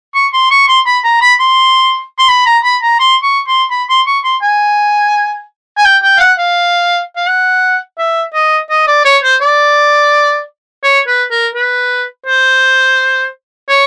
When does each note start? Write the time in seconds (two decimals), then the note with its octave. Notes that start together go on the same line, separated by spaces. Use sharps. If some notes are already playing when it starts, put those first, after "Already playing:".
0.15 C#6
0.33 C6
0.51 C#6
0.68 C6
0.86 B5
1.04 A#5
1.22 B5
1.40 C6
2.19 C6
2.29 B5
2.46 A#5
2.64 B5
2.83 A#5
3.00 C6
3.23 C#6
3.48 C6
3.71 B5
3.89 C6
4.07 C#6
4.24 C6
4.42 G#5
5.78 G#5
5.85 G5
6.03 G5
6.17 F5
6.20 F#5
6.38 F5
7.16 F5
7.27 F#5
7.98 E5
8.34 D#5
8.70 D#5
8.88 D5
9.05 C#5
9.24 C5
9.41 D5
10.84 C#5
11.07 B4
11.31 A#4
11.55 B4
12.26 C5
13.69 C#5